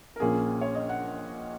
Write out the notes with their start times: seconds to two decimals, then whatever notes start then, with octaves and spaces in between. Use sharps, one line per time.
0.16 A#4
0.20 A#1 A#2 A#3 C#4 G#4
0.61 C#5
0.75 D#5
0.89 F#5